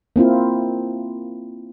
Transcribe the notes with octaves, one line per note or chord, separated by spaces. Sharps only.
A#3 C4 E4 F4